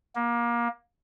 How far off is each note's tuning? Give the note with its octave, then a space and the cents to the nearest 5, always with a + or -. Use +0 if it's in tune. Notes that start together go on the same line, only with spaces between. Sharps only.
A#3 +25